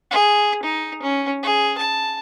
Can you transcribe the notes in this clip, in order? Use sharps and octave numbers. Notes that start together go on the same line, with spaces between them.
G#4
D#4
C#4
G#4
A5